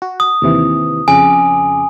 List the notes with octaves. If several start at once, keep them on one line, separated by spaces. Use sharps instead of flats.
F#4
D#6
D#2 C3 E3
F2 C#3 G#5 D6